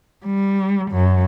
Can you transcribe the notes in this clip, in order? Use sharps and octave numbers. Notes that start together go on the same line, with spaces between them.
G3
F#2